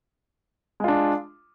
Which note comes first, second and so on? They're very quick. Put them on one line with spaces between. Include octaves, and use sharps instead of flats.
G#3 F4 D4